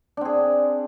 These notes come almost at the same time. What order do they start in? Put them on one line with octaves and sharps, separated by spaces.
D4 C4 G#4